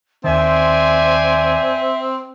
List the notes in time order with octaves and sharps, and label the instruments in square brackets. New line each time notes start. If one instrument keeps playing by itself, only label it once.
[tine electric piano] D#2 D#3 [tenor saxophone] C4 [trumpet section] C5 D5 G#5 [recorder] E5